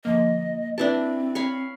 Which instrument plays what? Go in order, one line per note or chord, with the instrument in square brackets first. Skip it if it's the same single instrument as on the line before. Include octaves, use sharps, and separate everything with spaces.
[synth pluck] D3 F3 A#3 [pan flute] D#5
[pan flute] C4 [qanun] D4 E4 A5 [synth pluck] G4 B4 D6
[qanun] C#5 F5 B5